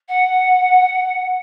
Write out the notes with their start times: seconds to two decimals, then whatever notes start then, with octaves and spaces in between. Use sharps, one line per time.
0.08 F#5